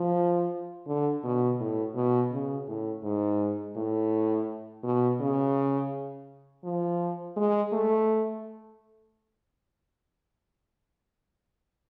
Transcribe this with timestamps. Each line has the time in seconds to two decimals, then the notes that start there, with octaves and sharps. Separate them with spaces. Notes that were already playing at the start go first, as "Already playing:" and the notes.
Already playing: F3
0.87 D3
1.24 B2
1.60 A2
1.95 B2
2.32 C#3
2.68 A2
3.03 G#2
3.77 A2
4.84 B2
5.20 C#3
6.64 F3
7.37 G#3
7.73 A3